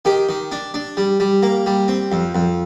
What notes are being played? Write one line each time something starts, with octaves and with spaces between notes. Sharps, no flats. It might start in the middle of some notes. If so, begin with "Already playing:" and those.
D#3 G4
D#3
D4
D4
G3
G3
A#3
G3
C4
F2
F2